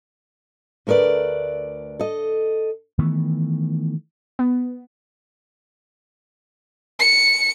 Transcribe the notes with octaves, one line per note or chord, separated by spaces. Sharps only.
D2 A3 A#4 B4 D5
A4 D#5
D#3 E3 A3 B3
B3
C#7